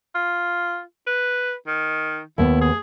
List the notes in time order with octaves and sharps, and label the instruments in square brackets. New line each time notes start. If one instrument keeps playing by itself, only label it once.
[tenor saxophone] F4
B4
D#3
[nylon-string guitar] D#2 B3 [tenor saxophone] E4
[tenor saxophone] G#4